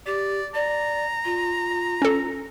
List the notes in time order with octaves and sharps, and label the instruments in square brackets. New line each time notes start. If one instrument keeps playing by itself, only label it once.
[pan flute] G4 [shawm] D5
[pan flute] D5 [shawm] A#5
[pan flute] F4
[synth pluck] C#4 A4